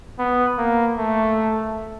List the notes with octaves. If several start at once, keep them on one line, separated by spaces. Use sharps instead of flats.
B3
A#3
A3